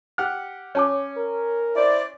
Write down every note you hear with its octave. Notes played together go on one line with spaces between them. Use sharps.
G4 F#5 F6
C#4 C#5 A5 D6
A#4
E4 C5 D5